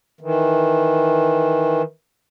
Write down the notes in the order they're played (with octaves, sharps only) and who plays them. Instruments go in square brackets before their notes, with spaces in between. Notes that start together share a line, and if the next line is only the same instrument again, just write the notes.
[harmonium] D#3 E3